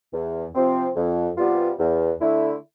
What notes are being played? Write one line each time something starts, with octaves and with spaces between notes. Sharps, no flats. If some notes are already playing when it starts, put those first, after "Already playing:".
E2
C3 F3 C4
F2
C3 G3 B3 F4
E2
D3 A3 E4